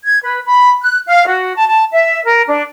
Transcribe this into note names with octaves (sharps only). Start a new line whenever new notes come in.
G#6
B4
B5
F#6
F5
F#4
A5
A5
E5
A#4
D4